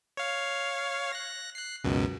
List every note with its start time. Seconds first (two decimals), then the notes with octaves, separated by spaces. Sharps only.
0.17 C#5 F5
1.12 F#6 A#6
1.55 F#6 C7
1.84 C#2 F#2 B2